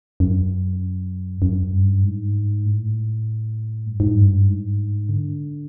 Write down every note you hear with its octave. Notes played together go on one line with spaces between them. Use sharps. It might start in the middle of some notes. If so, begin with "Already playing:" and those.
F#2
F#2
G2
G#2
A2
G2
G#2
G2
G#2
D3